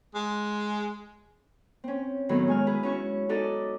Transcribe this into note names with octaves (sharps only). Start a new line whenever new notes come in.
G#3
C4 C#4
A2 D#3 F#3 B3
G#3 G#5 F6
E4 G#4 B4
C#4 F#4 C#6
C#4 D#4 F#4 A4 D5 D#5